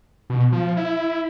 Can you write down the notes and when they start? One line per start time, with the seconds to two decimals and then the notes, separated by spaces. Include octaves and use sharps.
0.30 B2
0.52 F3
0.77 E4